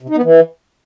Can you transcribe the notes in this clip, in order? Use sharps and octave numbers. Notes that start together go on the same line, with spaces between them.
C3
D#4
B3
E3